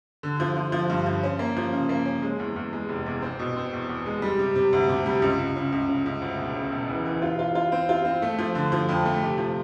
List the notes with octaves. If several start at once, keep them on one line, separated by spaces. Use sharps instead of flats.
D3
F3
F3
F3
G2
F3
C#4
A#3
F3
C#3
A#3
C#4
G#3
E2
E2
G#3
F1
E2
C4
B2
C4
E2
E2
G#3
G3
C3
C3
D2
C3
G3
C#2
C#2
C#3
C#2
C#3
C#2
D2
E1
C#3
E1
E3
E3
F4
F4
F4
C4
F4
C4
A3
F3
D3
F3
F2
A3
C3
F3